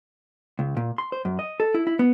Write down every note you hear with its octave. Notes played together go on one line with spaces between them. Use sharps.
C#2
A#2
C6
C5
F#2
D#5
A4
E4
E4
B3